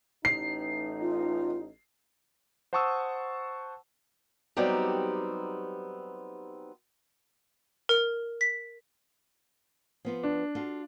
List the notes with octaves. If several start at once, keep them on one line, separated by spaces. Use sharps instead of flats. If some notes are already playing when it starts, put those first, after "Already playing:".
A1 D#4 C7
F4
C5 F#5 A5 C#6 D#6 E6
F#3 G3 B3 C4 D#4 G4
A#4
B6
F3 B3 F4
D4
F4 F#4 A4